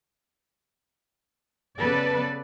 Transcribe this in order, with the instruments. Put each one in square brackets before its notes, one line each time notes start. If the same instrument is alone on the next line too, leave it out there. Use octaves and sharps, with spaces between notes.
[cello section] C#3 B3 A4 B4 D5